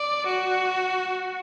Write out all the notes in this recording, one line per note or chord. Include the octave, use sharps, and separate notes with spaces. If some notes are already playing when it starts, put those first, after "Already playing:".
Already playing: D5
F#4